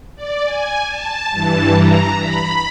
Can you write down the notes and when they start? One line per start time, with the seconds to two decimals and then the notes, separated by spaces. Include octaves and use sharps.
0.16 D5
0.45 G#5
0.88 A5
1.31 G2 E3 A5
1.75 A#5
2.19 B5